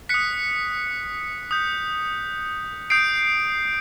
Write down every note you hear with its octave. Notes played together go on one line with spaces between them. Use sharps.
D#6 F#6 B6 C#7
D#6 G6
D#6 G6 C7 D7